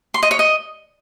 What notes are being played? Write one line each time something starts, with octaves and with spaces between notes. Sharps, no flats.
C6
D#5
C#5
D#5